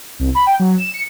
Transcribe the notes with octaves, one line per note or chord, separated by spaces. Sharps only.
C2
B5
G5
F#3
E7
C#7